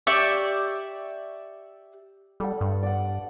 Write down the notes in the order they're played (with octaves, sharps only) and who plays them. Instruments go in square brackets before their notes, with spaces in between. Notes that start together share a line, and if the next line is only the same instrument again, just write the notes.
[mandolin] G4 D5 E5 C#6
[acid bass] G3 [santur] A4 F#5
[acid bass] G2
[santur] D5 F#5